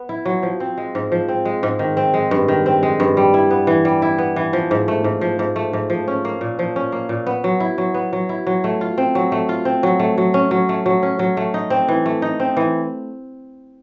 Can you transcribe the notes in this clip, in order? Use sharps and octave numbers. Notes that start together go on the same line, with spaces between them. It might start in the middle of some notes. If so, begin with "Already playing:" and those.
Already playing: B3
E4
F#3
F3
C4
G#3
G#2
F3
C4
G#3
G#2
D#3
C4
G#3
G2
D#3
C4
G#3
G2
G3
E4
B3
E3
G3
E4
B3
E3
F3
G#2
A3
G#2
F3
G#2
A3
G#2
F3
C#4
A#3
A#2
F3
C#4
A#3
A#2
B3
F#3
E4
F#3
B3
F#3
E4
F#3
A3
F4
C4
F#3
A3
F4
C4
F#3
A3
F#3
C#4
F#3
A3
F#3
C#4
F#3
A3
D#4
C4
E3
A3
D#4
C4
E3